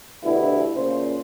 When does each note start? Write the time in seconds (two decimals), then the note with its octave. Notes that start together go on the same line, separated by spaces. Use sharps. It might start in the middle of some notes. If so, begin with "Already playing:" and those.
0.23 D2 G2 B2 E4
0.75 A#2 C#3 C5